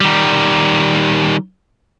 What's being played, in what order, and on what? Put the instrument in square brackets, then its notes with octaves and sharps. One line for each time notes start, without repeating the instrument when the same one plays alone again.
[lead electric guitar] D#3 G3